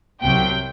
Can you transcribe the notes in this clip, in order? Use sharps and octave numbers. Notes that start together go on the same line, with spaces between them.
C2 C3 F#3 G5